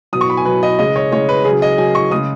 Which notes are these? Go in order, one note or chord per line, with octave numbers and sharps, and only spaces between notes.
B2 F#3 D#6
C#6
B5
G#5
B2 F#3 B4
D#5
C#3 G#3 D#5
C#5
C#3 G#3 C#5
B4
C#3 F#3 G#4
D#5
C#3 F#3 G#5
C#6
C#3 G#3 D#6